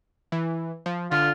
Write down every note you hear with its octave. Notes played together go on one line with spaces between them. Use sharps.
E3
F3
D3 F4